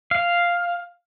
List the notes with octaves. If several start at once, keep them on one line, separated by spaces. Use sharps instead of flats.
F5